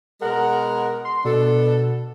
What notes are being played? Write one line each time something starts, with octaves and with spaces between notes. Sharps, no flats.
B2 G#3 A#4 F#5
C6
B2 B3 D4 A4